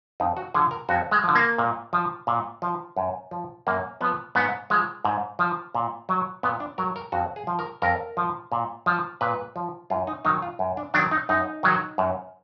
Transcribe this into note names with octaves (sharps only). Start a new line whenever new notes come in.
F2 D#4
F#4
D3 F3 G#4
A#4
F2 F#4
G#3
D3 F3
A#3
A#2
F3
A#2
F3
F#2
F3
F#2 A#3
F3 B3
G#2 B3
F3 G#3
G#2
F3
A#2
F#3
A#2 B3
D4
F#3 A#4
A#4
F2 F#4
G#4
F3
A#4
F2 A#4
F3
A#2
F3
A#2 B4
F3
F#2 F4
D#4
D#3 F#3 D#4
F4
F#2
D4
D#3 F#3 D4
D#4
F#2 D#4
D#3 F#3
F#2